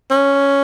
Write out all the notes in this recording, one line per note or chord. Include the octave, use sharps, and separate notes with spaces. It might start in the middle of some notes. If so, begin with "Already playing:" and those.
C#4